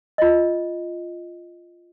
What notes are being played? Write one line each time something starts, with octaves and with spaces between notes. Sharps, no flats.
F4 D#5